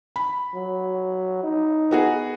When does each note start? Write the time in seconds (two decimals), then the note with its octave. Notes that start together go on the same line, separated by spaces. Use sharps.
0.16 B5
0.54 F#3
1.43 D#4
1.91 B3 F#4 G#4